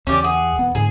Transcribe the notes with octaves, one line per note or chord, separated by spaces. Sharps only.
E2 C#4 G4 D5
G#4 F#5
E1 B3
G#2 D3 A3 G#4